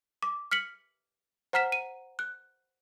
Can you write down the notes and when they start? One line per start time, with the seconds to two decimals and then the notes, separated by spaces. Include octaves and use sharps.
0.23 D6
0.51 F6 B6 C#7 F#7
1.53 C5 F#5 A#5 F6 B6 E7
1.72 D#7
2.19 F#6